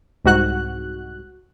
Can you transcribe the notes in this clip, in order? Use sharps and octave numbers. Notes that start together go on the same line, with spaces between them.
C2 G#2 F#4 F#6